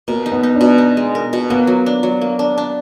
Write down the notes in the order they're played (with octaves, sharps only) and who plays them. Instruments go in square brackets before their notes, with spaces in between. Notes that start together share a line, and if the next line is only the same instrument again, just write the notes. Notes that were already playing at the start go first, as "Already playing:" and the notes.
[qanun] B2 [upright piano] A#3
[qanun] D#4
[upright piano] B3
[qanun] D#4
[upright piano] D4
[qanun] B2
D#4
G#3
A#4
B2
[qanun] A#3 [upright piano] B3
[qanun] F#3
D4
F#3
A#3
D4
D4